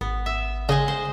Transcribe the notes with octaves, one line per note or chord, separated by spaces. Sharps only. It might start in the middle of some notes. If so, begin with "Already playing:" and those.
G#1 B3
E5
C#3 G#3 G#4 D#5
C5